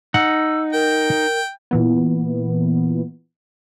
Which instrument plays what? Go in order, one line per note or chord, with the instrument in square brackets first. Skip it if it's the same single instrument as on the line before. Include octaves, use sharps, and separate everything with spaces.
[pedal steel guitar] D#4 [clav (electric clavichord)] F#5 [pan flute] E6
[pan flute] A#4 [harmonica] G5
[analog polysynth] A#2 E3 B3